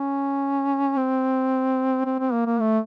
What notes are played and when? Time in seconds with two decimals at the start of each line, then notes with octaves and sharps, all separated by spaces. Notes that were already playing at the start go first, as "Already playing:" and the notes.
Already playing: C#4
0.97 C4
2.05 C4
2.19 C4
2.32 A#3
2.46 A#3
2.60 A3